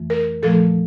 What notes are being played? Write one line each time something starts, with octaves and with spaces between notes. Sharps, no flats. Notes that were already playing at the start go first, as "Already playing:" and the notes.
Already playing: F2 E3 A3
A#4
A#2 F3 A3 A4